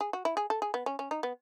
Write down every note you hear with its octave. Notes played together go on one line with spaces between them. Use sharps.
G#4
F#4
E4
G#4
A4
G#4
B3
C#4
C#4
D#4
B3